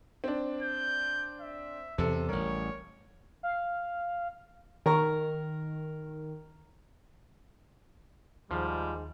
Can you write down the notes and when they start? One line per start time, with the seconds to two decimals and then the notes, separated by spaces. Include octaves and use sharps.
0.24 C4 D4
0.63 G6
1.41 E5
1.98 E2 C3 A4
2.29 A1 G3 A#4 C#5
3.43 F5
4.86 D#3 A#4 A#5 C#6
8.51 D#2 G#2 F3 G3